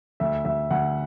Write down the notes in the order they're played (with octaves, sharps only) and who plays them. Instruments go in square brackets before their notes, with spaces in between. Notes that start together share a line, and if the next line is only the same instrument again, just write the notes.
[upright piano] D2 [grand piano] E5
[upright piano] D2 [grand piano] E5
[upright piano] D2 [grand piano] F#5